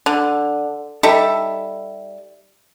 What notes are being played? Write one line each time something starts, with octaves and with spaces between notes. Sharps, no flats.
D3
G3 D#4 A4 E5